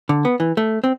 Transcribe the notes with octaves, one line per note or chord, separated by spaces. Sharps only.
D3
B3
E3
A3
C4